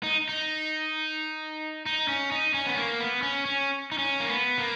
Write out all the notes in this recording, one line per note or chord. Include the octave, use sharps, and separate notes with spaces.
D#4
D#4
D#4
C#4
D#4
C#4
B3
A#3
B3
C#4
C#4
D#4
C#4
A#3
B3
A#3